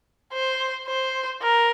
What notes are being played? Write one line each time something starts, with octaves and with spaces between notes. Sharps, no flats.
C5
C5
A#4